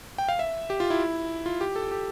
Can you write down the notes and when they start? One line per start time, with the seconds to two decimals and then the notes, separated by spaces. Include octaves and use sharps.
0.18 G5
0.29 F5
0.39 E5
0.70 G4
0.80 F4
0.90 E4
1.46 F4
1.61 G4
1.76 A4
1.91 G4